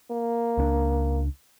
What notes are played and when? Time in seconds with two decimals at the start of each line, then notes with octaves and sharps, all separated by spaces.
0.11 A#3
0.57 C#2 C#4 D4